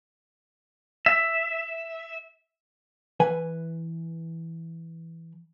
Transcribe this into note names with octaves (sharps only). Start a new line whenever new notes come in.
E5
E3 B4 G#5